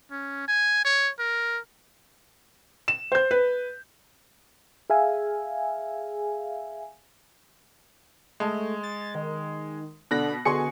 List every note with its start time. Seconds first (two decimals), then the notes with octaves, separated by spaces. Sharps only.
0.11 C#4
0.48 G#5
0.85 C#5
1.19 A#4
2.88 E7
3.12 C5 G6
3.31 B4
4.90 G#4 E5 F5 G#5
8.40 G#3 A3
8.83 A6
9.15 D#3
10.11 B2 D3 B5 F#6 A#6
10.45 B2 D3 G#4 G#5 C6 C#6 C#7